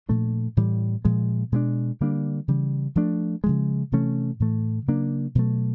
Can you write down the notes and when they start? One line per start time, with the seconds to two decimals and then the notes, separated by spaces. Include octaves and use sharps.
0.09 A#2 F3 A3 D4
0.57 A2 E3 G3
1.05 A#2 F3 G#3
1.52 B2 G#3 B3 D4
2.00 D3 G3 A#3 D4
2.48 C#3 E3 G3
2.96 F3 A3 D4
3.44 C#3 F3 G#3
3.92 C3 E3 A3 C#4
4.40 A2 E3 A3
4.88 C#3 F#3 A#3 D4
5.35 B2 F#3 A3